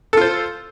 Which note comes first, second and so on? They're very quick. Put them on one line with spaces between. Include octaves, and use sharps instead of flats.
A4 F4 C5